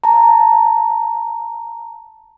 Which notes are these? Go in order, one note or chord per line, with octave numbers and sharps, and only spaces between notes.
A5 A#5